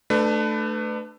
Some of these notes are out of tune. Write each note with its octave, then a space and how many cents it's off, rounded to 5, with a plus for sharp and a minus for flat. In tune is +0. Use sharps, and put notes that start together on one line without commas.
A3 +0 D4 +30 B4 +25